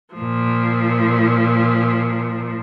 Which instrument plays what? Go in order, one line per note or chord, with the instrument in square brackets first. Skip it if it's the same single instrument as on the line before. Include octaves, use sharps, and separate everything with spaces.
[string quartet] A#2 F3